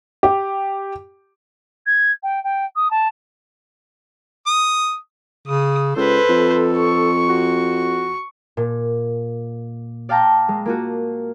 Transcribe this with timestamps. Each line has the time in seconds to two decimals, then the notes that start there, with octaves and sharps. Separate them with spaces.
0.23 G4
1.86 G#6
2.23 G5
2.44 G5
2.76 D#6
2.90 A5
4.47 D#6
5.47 C#3 D#6
5.96 C#2 A4 B4 C5
6.29 F2
6.78 C#6
7.29 F#4
8.57 A#2
10.09 D5 F5 G5 A5 A#5
10.49 G#3
10.66 A#3 F4 F#4